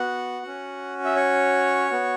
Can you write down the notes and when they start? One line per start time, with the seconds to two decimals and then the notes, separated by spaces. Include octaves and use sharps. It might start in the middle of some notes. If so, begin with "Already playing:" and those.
Already playing: B3 F#4 F#5
0.43 C#4 F#4
1.05 E5
1.16 C#5
1.89 B3 F#4